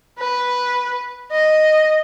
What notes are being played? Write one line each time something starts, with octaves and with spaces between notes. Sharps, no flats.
B4
D#5